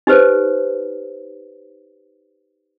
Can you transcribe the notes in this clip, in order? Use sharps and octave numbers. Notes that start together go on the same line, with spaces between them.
D#4 G4 B4 C5